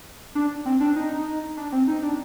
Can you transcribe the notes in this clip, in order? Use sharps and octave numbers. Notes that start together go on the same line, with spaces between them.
D4
C4
D4
D#4
D4
C4
D#4
D4